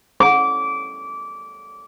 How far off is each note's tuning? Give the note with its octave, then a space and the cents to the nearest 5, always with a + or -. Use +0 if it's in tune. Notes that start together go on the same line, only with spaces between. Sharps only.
D6 -20